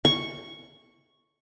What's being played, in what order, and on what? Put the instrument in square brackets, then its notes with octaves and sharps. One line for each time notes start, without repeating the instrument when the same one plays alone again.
[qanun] C#6